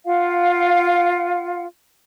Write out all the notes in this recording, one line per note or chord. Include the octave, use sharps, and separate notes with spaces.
F4 F5 F#5